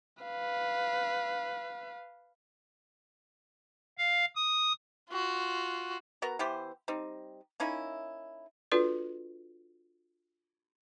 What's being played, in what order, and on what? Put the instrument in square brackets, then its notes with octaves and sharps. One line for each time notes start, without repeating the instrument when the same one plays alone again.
[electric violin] B4 F5
[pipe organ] F5
D#6
[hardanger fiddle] F4 F#4
[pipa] B3 F#4 A#4 A#5
E3 B3 G4 C5
G3 C4 D#4
A#3 C#4 D#4 E4
[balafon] D4 F4 F#4 A4 B4 D5